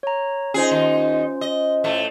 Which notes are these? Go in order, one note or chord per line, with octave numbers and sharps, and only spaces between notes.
C#5 A#5
C#4 D#4 F4 G#4 C5
D#2 D#4
D#5
A2 A3